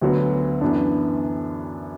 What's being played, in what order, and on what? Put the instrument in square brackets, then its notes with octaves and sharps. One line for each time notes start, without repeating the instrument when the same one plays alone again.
[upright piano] D2 D3 F#3 B3
F#2 E3 B3 D4